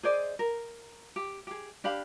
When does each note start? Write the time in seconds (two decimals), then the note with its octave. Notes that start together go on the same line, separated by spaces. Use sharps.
0.03 G#4 C5 D5 D#5
0.39 A#4
1.16 G4
1.47 G4 G#4
1.84 D4 G4 F5 B5